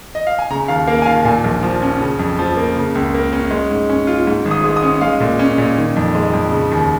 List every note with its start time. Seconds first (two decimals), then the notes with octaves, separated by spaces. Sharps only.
0.15 D#5
0.27 F5
0.39 G#5
0.50 C#3 A#5
0.68 D#2 F5
0.87 A#3 F5
1.02 G#5
1.06 D#2 F5
1.25 A#2 G#5
1.44 A#1
1.62 F3
1.82 C#4
2.01 C#3
2.19 F2
2.39 F3
2.57 A#3
2.76 C#3
2.95 C#2
3.14 A#3
3.33 C#4
3.51 G#3
3.71 G#2
3.90 C#4
4.07 F4
4.27 G#2
4.45 G#1
4.51 D#6
4.64 G#3
4.77 D#6
4.83 C#4
5.01 G#3 F5
5.20 A#2
5.39 C#4
5.58 A#2
5.78 D#3
5.96 F2
6.15 G#3
6.33 F2
6.52 C#3
6.72 D#2